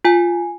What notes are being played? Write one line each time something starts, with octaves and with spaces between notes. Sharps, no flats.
F4 G#5